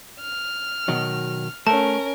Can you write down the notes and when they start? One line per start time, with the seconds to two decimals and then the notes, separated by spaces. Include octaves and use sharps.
0.21 F6
0.88 B2 D#3 F#3
1.67 A3 C#4 A#4 A5